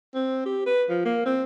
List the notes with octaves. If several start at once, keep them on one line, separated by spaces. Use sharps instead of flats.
C4
G4
B4
F3
A#3
C4